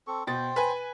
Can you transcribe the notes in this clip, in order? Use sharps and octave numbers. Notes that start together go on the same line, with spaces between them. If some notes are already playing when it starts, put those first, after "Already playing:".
C4 A4 C#6
B2 C5 G5 A6
B4 G#5